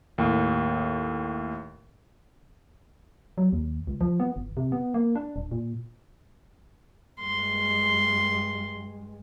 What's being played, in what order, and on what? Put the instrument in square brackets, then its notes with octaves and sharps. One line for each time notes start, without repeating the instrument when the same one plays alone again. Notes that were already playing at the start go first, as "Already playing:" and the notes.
[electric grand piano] D#2 A2
[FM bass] F#3
D#2
C#2
F3
B3
G1
C3
B3
A#3
D4
D#1
A#2
[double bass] G2 G#3 [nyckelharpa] C6